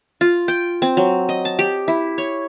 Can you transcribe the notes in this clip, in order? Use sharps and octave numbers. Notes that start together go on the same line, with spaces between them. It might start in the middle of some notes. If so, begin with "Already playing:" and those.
F4
G5
C4
F#3
D#5
A5
G4
E4
C#5